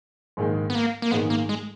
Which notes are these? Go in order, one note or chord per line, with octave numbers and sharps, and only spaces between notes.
A#1 G#2 D#3 G#3
B3
A#3
A#3
A#1 G#2 D#3 G#3 B3
A#3
G#3